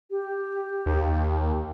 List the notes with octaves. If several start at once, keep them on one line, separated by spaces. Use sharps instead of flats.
G4
D#2